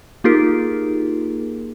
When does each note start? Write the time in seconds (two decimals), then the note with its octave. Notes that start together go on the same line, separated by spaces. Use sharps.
0.24 A#3 D#4 F4 G4 G#4 A#4